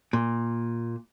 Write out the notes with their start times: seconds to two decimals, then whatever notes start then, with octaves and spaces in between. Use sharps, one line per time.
0.13 A#2